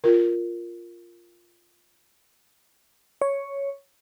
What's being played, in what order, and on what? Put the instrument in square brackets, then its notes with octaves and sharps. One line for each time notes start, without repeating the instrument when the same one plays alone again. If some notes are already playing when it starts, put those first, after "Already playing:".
[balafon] F4 A#4
[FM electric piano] C#5